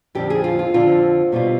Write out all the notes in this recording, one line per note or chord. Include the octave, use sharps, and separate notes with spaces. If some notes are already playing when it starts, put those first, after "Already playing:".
F2 D3 F3 C4 G4
G#4
F4
F4
F2 D3 F3 C4 F4
B2 G3 C4 F4